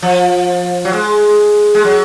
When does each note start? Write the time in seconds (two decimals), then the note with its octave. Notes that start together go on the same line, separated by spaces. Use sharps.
0.02 F3
0.85 F#3
0.93 G#3
1.75 G#3
1.85 F#3